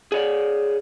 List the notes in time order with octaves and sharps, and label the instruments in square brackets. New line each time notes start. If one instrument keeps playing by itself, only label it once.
[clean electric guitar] G#4 C#5 D5